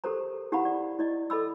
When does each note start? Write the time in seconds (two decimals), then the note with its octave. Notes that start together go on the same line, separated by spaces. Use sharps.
0.04 G4 A4 A#4 C5 A#5
0.52 E4 G4 F5 F#5 A#5 B5
0.65 D5
0.99 E4 D5 D#5
1.30 A4 D#5 B5 E6